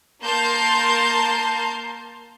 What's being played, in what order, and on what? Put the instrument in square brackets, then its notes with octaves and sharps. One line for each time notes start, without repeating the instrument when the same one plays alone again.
[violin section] A#3 A#4 A5 C6 G6